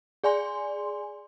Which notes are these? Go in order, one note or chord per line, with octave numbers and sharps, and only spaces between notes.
G#4 D5 G#5 C6